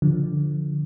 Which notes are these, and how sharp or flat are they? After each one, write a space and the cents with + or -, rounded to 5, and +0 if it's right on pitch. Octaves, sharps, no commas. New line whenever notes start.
D3 +0 F3 -5